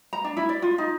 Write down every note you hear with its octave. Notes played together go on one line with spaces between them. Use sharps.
A#5
D4
E4
D5
F4
D#4